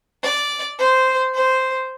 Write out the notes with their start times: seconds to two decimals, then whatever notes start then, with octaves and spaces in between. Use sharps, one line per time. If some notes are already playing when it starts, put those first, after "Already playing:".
0.23 D5
0.78 C5
1.34 C5